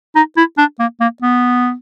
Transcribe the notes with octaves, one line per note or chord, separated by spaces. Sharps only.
D#4
E4
D4
A#3
A#3
B3